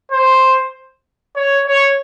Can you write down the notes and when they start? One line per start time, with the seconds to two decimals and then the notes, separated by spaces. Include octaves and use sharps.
0.12 C5
1.36 C#5
1.67 C#5